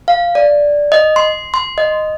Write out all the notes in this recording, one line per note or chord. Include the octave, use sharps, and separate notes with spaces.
F5
D5
D#5
C6
C6
D#5